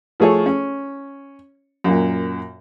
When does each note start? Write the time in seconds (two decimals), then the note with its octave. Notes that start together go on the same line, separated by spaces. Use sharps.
0.20 F3 A3 G#4 A4 C#5
0.46 C#4
1.84 F#2 A#2